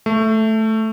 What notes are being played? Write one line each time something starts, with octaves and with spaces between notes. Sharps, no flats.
A3